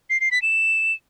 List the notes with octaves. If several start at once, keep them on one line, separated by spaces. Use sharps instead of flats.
C7
C7
B6
E7